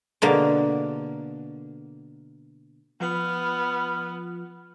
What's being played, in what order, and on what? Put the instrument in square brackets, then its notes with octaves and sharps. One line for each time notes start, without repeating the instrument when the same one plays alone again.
[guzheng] B2 D3 A#3
[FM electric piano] F3 F4 B5 [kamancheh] B3 [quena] F6